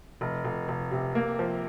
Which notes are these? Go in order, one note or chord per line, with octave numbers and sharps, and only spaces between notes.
F1
F1
F1
C3
A#3
F3